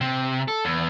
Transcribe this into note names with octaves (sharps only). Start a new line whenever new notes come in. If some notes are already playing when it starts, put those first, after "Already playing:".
C3
A4
E2